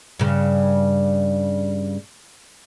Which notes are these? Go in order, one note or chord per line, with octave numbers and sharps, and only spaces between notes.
G2 C#3